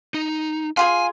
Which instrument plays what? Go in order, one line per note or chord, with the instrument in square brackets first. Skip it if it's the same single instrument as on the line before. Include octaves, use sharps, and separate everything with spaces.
[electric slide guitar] D#4
[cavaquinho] F4 G4 G#4 [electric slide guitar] G#5